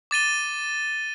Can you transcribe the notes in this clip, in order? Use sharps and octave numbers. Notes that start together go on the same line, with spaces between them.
D6 A6 D#7 G7